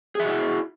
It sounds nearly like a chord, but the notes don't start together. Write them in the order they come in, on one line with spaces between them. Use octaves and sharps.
G#4 E5 F#4 E4